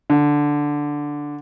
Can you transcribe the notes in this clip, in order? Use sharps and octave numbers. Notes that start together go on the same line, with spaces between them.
D3